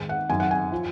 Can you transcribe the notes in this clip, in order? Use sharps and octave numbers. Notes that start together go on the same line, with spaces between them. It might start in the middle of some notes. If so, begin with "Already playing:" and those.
Already playing: G#2 D#3
F#5
F#2 D#3 G#5
F#5
G#5
F3